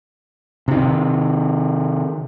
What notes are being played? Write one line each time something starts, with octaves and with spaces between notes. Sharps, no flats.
C3 D#3